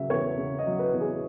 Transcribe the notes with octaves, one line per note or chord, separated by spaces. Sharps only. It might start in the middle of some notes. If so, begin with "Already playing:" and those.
Already playing: C#3 F#3 E5
E2 C#5
C#3
D#5
F#3
B4
E2
G#4